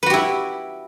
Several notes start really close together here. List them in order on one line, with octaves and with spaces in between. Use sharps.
B4 F#4 G4 E4